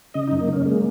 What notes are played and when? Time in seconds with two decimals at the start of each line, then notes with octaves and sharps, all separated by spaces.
0.14 C#3 D#5
0.28 F#2 D#4
0.40 A#3
0.48 C#3 C#4
0.66 G#3 A#3